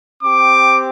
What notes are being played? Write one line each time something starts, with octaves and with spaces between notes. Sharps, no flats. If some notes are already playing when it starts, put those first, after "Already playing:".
C4 G4 D6